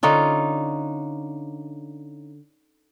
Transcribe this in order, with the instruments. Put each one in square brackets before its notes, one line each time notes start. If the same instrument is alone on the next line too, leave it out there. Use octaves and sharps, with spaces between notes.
[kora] D3 C#4 D#4 F4